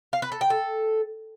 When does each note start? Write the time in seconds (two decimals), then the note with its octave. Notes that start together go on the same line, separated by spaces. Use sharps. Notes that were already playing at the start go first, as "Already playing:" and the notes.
0.13 F5
0.22 B4
0.32 A4
0.41 G5
0.50 A4